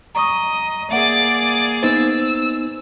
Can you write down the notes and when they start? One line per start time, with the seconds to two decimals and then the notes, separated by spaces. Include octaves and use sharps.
0.15 D#5 A#5 C#6 D#6
0.91 A#3 G#4 D5 E5 F#5 D6
1.83 B3 D#4 C5 E6 A6